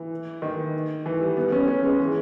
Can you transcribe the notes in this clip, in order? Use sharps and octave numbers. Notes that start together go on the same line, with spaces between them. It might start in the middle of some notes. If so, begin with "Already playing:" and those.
Already playing: E3
D#3
E3
G3
B3
C#4
C#4
G#3
E3